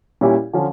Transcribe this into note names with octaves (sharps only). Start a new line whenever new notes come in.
A#2 G3 C#4 E4 G4
D3 F3 C#4 F4